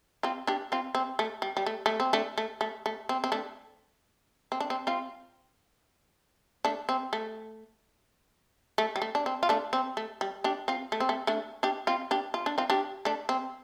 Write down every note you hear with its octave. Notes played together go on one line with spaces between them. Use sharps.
C4 F4
D4 G4
C4 F4
C4
A3
G3
G3
A3
A3
C4
A3 D4
A3
A3
A3
C4
C4
A3 D4
C4
D4
C4
C4 F4
A3 D4
C4
A3
A3
G3
A3
D4
C4
F4
A3 D4
C4
A3
G3
D4 G4
C4 F4
A3
C4
A3
A3 D4
D4 G4
C4 F4
D4 G4
F4
D4
C4 F4
D4 G4
A3 D4
C4